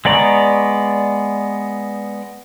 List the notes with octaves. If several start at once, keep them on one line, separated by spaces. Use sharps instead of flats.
G#3 B3 D5 A#5 C#6